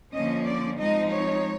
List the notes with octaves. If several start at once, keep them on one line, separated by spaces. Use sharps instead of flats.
D3 F3 A#3 C#4 D#5
D5
F3 G#3 C4 D#4 D#5
C#5